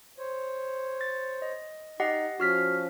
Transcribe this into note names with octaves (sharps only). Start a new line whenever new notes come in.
C5 C#5
A6
D#5
D#4 G4 D#5 F#5
F3 C#4 F#4 F6 B6